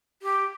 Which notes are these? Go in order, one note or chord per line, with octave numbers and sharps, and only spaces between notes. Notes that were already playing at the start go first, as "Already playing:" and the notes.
G4